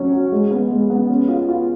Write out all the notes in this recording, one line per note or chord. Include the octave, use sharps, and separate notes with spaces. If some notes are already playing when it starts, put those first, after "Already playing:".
Already playing: F#3 C#4
F#4
G#3
B3
G#3
B3
C#4
F4
F4